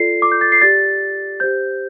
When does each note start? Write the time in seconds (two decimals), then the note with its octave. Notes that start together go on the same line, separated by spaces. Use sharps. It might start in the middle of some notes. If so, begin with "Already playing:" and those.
Already playing: F4 A4 D5 C7
0.22 D6
0.32 G6
0.41 A6
0.52 C7
0.62 G4 D5 A6
1.40 G4 C5 G6